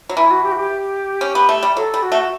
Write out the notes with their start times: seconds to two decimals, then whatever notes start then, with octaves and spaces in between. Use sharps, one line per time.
0.09 F#3
0.16 E3 E4
0.31 F#4
0.43 G4
0.51 F#4
0.57 G4
1.21 C#4
1.35 B3
1.49 A3
1.63 G3
1.77 F#3 A4
1.94 G3
2.02 F#4
2.12 A3